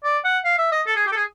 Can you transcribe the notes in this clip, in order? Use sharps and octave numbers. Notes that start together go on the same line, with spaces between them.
D5
F#5
F5
E5
D#5
A4
G#4
G4
A4
G#4